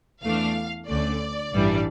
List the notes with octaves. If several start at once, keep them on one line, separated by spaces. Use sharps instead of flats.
E2 E3 A3 D4 F5
D2 D3 A3 C#4 D5
A1 G2 E3 G3 D4